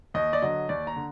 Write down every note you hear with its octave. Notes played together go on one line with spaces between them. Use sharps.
D#2 D#5
D5
D3 F#3 D#5
D#2 D5
A#5
D3